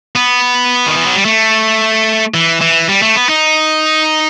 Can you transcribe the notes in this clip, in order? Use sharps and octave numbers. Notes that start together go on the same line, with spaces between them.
B3
D#3
E3
F#3
G3
A3
E3
E3
G3
A3
B3
D#4